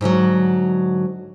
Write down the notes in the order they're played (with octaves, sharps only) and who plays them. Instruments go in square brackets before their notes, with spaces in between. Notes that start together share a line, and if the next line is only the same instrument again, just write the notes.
[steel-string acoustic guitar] G#2 D3 E3 F#3